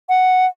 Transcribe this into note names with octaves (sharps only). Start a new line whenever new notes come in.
F#5